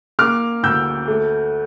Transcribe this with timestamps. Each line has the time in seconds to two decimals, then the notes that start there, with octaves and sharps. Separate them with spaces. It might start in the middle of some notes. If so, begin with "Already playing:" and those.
0.19 A#3 D6 F6
0.63 D2 E6 G6
1.08 A3